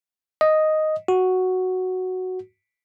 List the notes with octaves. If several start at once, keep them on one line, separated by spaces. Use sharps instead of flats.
D#5
F#4